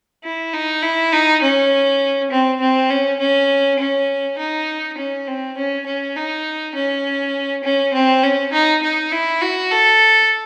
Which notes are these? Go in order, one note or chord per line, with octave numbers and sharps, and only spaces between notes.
E4
D#4
E4
D#4
C#4
C4
C4
C#4
C#4
C#4
D#4
C#4
C4
C#4
C#4
D#4
C#4
C#4
C4
C#4
D#4
D#4
E4
F#4
A4